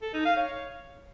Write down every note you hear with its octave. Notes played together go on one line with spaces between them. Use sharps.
A4
D#4
F5
C#5